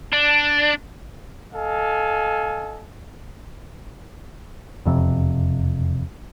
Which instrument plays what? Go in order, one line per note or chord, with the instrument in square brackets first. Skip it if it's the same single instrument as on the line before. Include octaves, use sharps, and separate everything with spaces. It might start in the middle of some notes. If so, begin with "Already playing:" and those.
[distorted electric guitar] D4
[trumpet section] A4 D#5 F5 G#5
[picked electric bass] E1 F2 C3